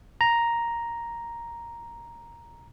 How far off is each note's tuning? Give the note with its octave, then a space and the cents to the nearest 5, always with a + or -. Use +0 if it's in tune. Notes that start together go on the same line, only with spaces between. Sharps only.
A#5 +5